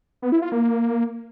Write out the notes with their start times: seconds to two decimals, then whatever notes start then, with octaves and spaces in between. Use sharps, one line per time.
0.22 B3
0.32 E4
0.42 F4
0.52 A#3